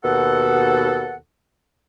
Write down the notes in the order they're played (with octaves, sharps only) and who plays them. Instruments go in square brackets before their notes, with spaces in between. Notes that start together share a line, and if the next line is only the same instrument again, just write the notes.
[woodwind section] D#2 B2 A4 F#5